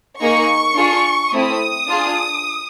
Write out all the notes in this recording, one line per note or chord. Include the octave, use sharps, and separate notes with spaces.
A#3 D#4 G#4 C#6
D4 F4 G#4
A3 C4 E4 D#6
D4 F4 G#4